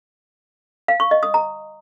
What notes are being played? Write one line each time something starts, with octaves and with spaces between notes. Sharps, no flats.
F5
C#6
D#5
D#6
A#5